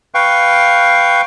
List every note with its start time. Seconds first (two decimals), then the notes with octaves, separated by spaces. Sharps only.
0.15 B4 F5 G5 C#6